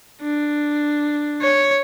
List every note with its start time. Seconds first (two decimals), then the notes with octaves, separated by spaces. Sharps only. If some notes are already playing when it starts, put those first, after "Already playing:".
0.22 D4
1.42 C#5